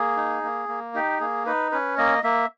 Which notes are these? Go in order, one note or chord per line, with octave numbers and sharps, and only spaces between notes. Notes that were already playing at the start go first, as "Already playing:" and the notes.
Already playing: A#3 G#4
D#4
A#3
A#3
D#4 G4
A#3 G#4
D#4 B4
C#4 B4
A#3 D#5
A#3 E5